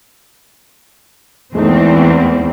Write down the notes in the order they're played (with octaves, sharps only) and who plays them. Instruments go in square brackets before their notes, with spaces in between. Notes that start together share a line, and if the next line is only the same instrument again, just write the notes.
[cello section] E2 C4 [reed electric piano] G#3 A3 D#4